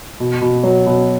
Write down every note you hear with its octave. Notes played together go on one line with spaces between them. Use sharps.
B2
B2
F#3
B2